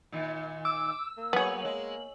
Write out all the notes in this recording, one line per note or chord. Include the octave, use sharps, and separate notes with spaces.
A#2 D#3
D6 E6
A#3
F#3 B3 G#4 C#5 F#7
G#3